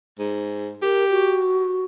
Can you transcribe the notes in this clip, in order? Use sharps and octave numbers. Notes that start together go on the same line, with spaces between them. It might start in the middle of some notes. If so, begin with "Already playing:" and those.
G#2
G4 A#4
F#4